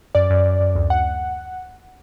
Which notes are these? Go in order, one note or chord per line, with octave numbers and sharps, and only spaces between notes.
F#2 D5
F#2
F#2
F#2
D2
D2 F#5